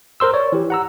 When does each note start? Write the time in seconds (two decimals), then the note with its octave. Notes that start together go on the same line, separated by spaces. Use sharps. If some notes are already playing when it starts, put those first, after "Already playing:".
0.20 A#4 C5 C6 E6
0.34 C#5 D5
0.52 E3 G4
0.70 F#5 A#5 E6